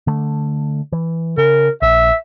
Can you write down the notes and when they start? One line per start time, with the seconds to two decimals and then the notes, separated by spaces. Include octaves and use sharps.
0.07 D3 A3
0.92 E3
1.38 C#3 A#4
1.82 A#1 E5